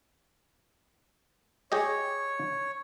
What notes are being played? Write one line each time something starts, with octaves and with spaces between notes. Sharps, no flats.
G4 G#4 C#5 D#5